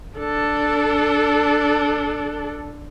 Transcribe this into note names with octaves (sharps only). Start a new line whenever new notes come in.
D4 A4